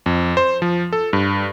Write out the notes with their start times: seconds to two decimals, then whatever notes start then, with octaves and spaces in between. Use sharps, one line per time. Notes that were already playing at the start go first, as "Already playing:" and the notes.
0.06 F2
0.37 C5
0.62 F3
0.93 A4
1.13 G2